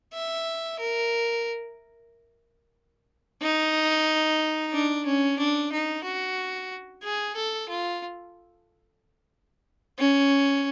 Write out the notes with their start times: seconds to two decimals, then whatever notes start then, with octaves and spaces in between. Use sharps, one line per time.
0.14 E5
0.79 A#4
3.42 D#4
4.73 D4
5.06 C#4
5.38 D4
5.72 D#4
6.04 F#4
7.03 G#4
7.35 A4
7.69 F4
9.99 C#4